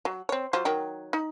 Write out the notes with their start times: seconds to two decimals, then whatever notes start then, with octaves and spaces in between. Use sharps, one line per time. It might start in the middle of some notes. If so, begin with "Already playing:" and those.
0.05 F#3
0.29 C4 C#5
0.53 F#3 F4 C5
0.65 D#3 F#3 G5
1.13 D#4